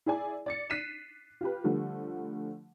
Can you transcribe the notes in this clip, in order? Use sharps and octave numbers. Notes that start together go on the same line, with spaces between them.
E4 G#4 D5 G#5
D5 A6 C#7
F#6 B6 C7 D#7 E7
F4 G4 B4
D3 F3 G3 A3